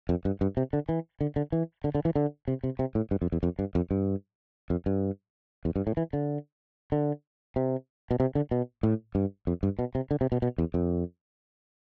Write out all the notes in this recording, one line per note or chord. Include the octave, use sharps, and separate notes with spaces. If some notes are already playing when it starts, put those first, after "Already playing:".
F2
G2
G2
C3
D3
E3
D3
D3
E3
D3
D3
E3
D3
C3
C3
C3
A2
G2
F2
E2
F2
G2
F2
G2
F2
G2
E2
G2
A2
E3
D3
D3
C3
B2
C3
D3
B2
A2
G2
F2
G2
B2
C3
D3
C3
B2
B2
E2
F2